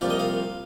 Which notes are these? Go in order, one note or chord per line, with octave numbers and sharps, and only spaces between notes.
C2 A#2 F3 D5
D#5
F5